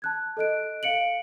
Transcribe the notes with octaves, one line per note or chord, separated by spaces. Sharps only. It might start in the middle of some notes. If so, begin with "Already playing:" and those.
A5 F#6 G#6
A4 D#5 F#6 D7
F5 C#7 D7 F#7